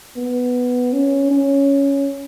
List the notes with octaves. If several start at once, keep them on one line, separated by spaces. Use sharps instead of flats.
B3
C#4
C#4